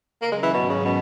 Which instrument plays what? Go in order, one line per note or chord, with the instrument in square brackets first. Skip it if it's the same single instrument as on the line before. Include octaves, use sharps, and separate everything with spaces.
[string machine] C#3 F#3 C#4 [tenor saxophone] A#3
[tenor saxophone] G#3
E3
[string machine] G#2 D#3 F#3 C#4 [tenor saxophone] B2
[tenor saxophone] C#3
B2